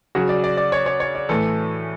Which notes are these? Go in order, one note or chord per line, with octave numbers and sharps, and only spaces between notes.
C#3 F#3 F#4
D5
D5
D5
C#5
C#5
C#5
D5
A2 E3 A4